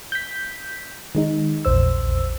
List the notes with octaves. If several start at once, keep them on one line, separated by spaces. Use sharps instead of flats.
G6 B6
D#3 G#3 D#4
A#1 E2 C5 E6